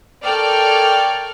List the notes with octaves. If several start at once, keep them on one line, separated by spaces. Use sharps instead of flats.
A4 A#4 C#5 D5 G5 F6